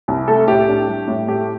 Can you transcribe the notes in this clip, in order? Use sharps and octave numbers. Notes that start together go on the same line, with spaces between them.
C2
A3 A4
A2 G4
D4
G3
A2
A3 G4